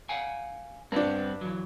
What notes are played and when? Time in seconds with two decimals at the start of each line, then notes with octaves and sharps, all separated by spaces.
0.09 F5 F#5 G#5
0.92 G2 G3 B3 C4 D4
1.41 E3 F#3